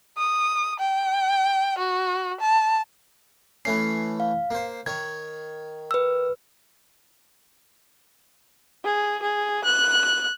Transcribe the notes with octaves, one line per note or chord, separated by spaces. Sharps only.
D#6
G5
F#4
A5
E3 A3 C#4 C7
F5
A#3 C5
D#3 C#5 G#6
B4 E6
G#4
G#4
F#6